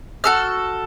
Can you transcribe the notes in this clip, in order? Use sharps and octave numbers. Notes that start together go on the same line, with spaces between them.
F#4 A4 F6